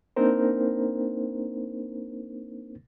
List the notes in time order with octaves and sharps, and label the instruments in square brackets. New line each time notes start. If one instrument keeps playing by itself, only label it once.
[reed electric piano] A#3 C4 D4 D#4 A#4 C5